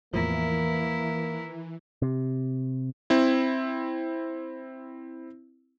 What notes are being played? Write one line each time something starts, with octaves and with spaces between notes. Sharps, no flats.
E2 A2 E3 F3 A#3 E4 A#4
C3
C4 E4